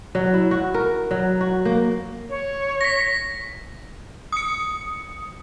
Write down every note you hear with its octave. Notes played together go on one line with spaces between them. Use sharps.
F#3
E4
F#4
A#4
F#3
F#4
A#3
C#5
A#6 B6
D#6 C#7